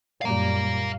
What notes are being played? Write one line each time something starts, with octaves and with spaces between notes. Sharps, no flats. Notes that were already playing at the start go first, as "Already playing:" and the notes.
F#2 A#2 G3 F5 A#5